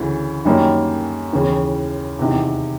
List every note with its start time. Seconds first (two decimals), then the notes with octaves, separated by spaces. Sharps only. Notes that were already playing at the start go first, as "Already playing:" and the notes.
Already playing: D2 C#3 E3
0.45 F#2 D#3 G3 A#3 C#4
1.33 D#2 C#3 E3
2.19 E2 C3 D#3